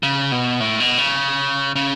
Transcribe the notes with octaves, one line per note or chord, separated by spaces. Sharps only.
C#3
B2
A2
B2
C#3
C#3